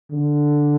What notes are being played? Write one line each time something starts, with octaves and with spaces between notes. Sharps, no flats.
D3